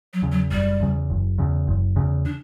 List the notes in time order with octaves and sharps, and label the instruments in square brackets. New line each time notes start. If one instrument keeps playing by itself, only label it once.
[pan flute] F#3
[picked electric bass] E2 C#3
[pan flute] F#3
[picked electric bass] F#1 [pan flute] G3
[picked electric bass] E2 C#3
F#1
E2 C#3
F#1
E2 C#3
[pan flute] D4